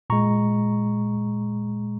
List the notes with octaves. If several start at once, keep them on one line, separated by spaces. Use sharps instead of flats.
A#2 G#3 A#5 C#6